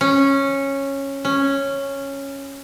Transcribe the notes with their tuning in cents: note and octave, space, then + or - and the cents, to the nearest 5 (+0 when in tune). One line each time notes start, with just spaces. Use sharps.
C#4 -10
C#4 -5